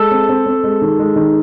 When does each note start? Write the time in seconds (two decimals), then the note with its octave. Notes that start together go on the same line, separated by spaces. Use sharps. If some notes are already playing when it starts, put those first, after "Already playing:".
Already playing: G#3 A4
0.11 C4
0.29 C4
0.46 C4
0.64 G#3
0.82 D#3
0.99 G#3
1.16 D#3